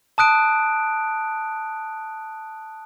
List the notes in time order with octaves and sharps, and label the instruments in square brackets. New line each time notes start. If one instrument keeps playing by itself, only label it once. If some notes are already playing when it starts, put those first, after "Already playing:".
[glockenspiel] A5 D#6 F#6 D7